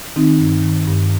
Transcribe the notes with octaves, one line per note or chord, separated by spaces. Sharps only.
D#3 C4 D#4
G2
D#3
G2